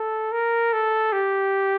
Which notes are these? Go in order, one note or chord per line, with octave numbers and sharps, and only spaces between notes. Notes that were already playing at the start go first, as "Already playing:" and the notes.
Already playing: A4
A#4
A4
G4